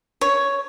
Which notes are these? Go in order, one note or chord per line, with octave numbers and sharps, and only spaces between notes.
C#5